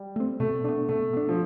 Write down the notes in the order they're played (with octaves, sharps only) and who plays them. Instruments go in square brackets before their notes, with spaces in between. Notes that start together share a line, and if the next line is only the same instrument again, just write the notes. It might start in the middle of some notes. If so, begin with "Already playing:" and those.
Already playing: [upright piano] G3
[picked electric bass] A3 C4
[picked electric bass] B2 [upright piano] A3
[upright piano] A3 [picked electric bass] D4
[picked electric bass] B3
[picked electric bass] B2 [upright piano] A3
[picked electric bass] B3 D4
[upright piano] F3